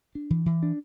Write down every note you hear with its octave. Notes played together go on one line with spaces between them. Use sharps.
D4
E3
E3
D4